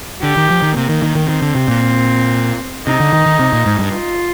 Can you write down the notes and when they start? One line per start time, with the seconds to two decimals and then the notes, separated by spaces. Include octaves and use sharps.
0.23 D3 G4
0.37 D#3
0.50 F3
0.62 D#3
0.76 C3 A#3
0.89 D#3
1.02 D#3
1.15 D#3
1.29 D#3 C4
1.42 D3
1.55 C3
1.68 A#2
2.87 C3 D#4
3.00 D3
3.13 D#3
3.26 D#3
3.40 C3
3.53 A#2
3.66 G#2
3.79 G2
3.92 F4